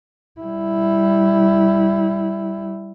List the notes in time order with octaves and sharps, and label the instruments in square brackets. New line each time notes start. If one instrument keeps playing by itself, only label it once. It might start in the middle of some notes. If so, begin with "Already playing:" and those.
[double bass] G3 E4